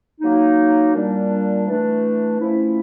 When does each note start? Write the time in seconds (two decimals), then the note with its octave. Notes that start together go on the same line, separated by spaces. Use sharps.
0.21 F#3 A#3 D#4
0.94 A#2 G3 A#3 D4
1.67 E3 A3 D4
2.40 F3 A3 C#4 E4